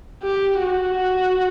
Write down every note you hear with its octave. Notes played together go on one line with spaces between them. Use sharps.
G4
F#4